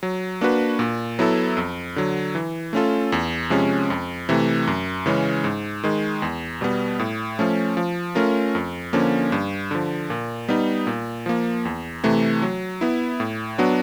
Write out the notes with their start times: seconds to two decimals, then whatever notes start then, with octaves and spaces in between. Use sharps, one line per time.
0.03 F#3
0.41 A#3 D4 F#4 B4
0.79 A#2
1.19 F#3 B3 E4 A4
1.57 F2
1.96 D3 F#3
2.35 E3
2.73 A3 C#4 F4 A4
3.12 E2
3.50 C3 F3 G#3 C#4
3.90 F2
4.29 C3 E3 A3
4.67 F#2
5.06 C#3 E3 G#3 C#4
5.44 G#2
5.84 D#3 G#3
6.22 E2
6.61 B2 G3 B3
6.99 A2
7.39 F3 A3 C#4
7.77 F3
8.15 A3 C#4 F4 A#4
8.55 F2
8.93 D3 F3 A#3 C#4
9.32 G2
9.71 D3 F3
10.10 A#2
10.48 G3 B3 D#4
10.87 A#2
11.26 F3 A#3
11.65 E2
12.04 C3 E3 A3
12.42 F#3
12.81 B3 E4
13.20 A2
13.58 F#3 B3 D4 F#4